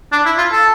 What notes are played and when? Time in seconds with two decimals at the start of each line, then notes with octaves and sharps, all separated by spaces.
0.12 D4
0.26 E4
0.38 F4
0.52 A4